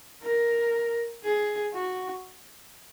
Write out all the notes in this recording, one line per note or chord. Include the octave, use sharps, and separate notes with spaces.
A#4
G#4
F#4